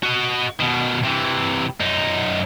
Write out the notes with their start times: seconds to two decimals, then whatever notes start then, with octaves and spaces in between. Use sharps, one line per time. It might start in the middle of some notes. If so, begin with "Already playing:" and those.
0.03 F#4 D#5
0.59 B2 D#3
1.04 C3 E3
1.81 F#2 D#4